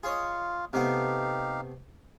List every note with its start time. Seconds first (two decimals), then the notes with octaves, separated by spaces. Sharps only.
0.03 F4 G#4 C#5 D#5
0.73 C3 A3 B3 D#4 G4 F5